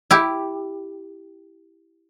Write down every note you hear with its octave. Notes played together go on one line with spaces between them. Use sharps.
E4 G4